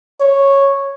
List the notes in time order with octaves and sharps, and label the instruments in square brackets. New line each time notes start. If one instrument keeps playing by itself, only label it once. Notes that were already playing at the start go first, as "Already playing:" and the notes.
[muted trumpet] C#5